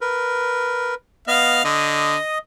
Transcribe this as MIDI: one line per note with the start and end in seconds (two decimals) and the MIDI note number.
0.01 0.95 70
0.01 0.95 71
1.27 1.62 59
1.27 1.62 75
1.27 1.63 77
1.27 1.62 89
1.65 2.14 50
1.65 2.38 75
1.65 2.38 87